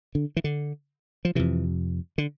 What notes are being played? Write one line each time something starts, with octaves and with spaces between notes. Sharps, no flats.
D3
E3
D3
F3
F2 C3 E3
D3